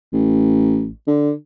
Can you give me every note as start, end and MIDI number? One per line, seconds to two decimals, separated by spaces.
0.13 0.89 33
1.07 1.32 50